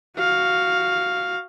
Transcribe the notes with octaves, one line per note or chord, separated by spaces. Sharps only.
F#4 F5